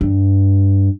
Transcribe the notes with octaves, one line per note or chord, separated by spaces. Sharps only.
G2